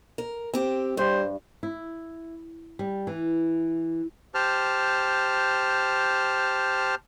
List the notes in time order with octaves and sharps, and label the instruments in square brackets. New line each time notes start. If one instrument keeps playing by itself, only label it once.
[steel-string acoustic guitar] A#4
C4 G4
[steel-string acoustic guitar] G2 [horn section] G3 C5
[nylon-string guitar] E4
G3
E3
[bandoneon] G4 C5 A5 F6